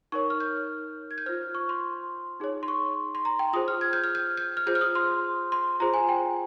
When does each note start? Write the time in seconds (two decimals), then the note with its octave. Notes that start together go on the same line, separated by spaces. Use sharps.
0.12 D#4 A#4 C#5 C#6
0.30 F6
0.40 G6
1.11 G#6
1.18 G6
1.26 F4 C5 F6
1.55 C#6
1.69 C6
2.40 D#4 G#4 C#5
2.63 C6
2.68 C#6
3.15 C6
3.25 A#5
3.39 G5
3.53 F4 G#4 C5 D#6
3.68 F6
3.81 G#6
3.93 G6
4.04 F6
4.15 G6
4.37 G6
4.57 F6
4.67 F4 G#4 C5 G6
4.75 F6
4.81 D#6
4.95 C6
5.52 C6
5.80 F4 G#4 C5 A#5
5.94 G#5
6.09 G5